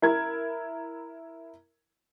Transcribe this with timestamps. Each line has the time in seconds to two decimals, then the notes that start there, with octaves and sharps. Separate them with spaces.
0.02 E4 A#4 G#6